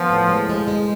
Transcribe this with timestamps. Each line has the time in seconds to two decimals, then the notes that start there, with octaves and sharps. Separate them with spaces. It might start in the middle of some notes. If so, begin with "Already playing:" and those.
Already playing: F3 B3
0.10 A2
0.29 G#3
0.49 G#3
0.68 G#3